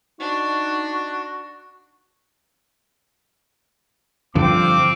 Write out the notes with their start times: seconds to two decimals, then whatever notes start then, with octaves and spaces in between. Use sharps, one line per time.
0.20 D4 D#4 F#4
4.35 G2 D3 F3 C4 D6